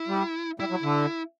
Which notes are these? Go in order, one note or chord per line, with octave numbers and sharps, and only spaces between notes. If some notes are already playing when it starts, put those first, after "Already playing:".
Already playing: E4
G3
G3 E4
F#3
D3